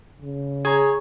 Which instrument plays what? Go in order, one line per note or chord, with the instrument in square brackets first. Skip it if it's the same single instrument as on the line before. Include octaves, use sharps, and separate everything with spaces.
[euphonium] C#3
[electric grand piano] G#4 A#5 [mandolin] C#5